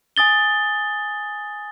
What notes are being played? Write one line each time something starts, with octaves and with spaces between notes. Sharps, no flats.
G#5 D#6 A6 G7